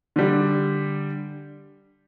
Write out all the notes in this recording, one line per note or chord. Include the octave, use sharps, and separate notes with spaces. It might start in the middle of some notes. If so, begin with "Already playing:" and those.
D3 G3